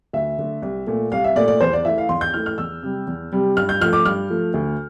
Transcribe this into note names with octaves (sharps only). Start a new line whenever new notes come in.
D2 E5
D3 A3
C2
A#2 A3
C2 F5
E5
A#2 A3 D5
D5
E2 C5
D5
E3 A3 E5
F5
E2 C6
G6
E3 A3 F6
F6
E2 E6
C3 G3
E2
C3 G3
G2 F6
G6
F3 A3 F6
D6
G2 F6
F3 A3
D2